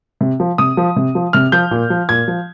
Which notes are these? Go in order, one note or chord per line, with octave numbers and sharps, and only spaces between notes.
C3
F3
C3 D#6
F3
C3
F3
C3 F6
F3 G6
A#2
F3
A#2 G#6
F3